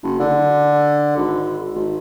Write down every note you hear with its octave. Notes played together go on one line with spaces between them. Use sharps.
F#1
D3
G#1
G#1